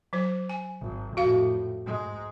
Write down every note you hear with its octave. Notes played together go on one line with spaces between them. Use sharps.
F#3 C5
G#5
G#1
F2 A2 F#4 F5
G#2 G#3